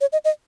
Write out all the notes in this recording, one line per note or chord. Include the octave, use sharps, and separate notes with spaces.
C#5
D#5
D#5